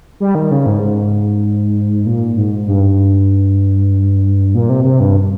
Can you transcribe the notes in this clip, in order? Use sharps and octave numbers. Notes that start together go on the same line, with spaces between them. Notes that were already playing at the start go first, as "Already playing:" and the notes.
G3
D#3
C#3
G#2
G#2
A#2
G#2
G2
A#2
C3
C3
G2